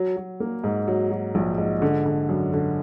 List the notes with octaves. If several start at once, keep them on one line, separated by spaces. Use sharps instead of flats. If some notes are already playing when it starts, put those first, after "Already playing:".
Already playing: F#3
F#3
A#3
G#2
F#3
F#3
A#1
G#2
D3
D3
F#2
D3